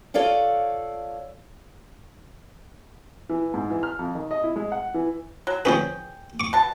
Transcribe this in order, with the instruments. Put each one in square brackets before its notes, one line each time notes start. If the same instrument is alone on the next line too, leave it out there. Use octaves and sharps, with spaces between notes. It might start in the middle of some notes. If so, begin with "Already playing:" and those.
[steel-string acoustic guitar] F4 A4 C#5 D5 F5 F#5
[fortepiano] E3
G#2
E3
F6
F2
D#3
D#5
E4
G#3
F#5
E3
[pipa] F#3
[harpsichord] F3 C#4 B4 [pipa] G#4 G5
[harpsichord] C#6 D6
[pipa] B2 A5